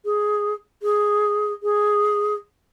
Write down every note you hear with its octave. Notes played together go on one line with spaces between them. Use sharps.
G#4
G#4
G#4